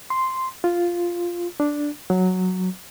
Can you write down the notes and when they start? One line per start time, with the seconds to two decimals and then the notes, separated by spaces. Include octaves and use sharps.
0.10 C6
0.64 F4
1.60 D4
2.10 F#3